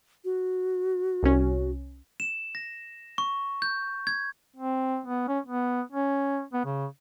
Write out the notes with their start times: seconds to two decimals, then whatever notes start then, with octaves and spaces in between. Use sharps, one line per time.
0.25 F#4
1.23 C2 C#4
2.20 E7
2.55 A#6
3.18 C#6
3.62 G6
4.07 G#6
4.56 C4
5.06 B3
5.28 C#4
5.47 B3
5.92 C#4
6.53 B3
6.65 C#3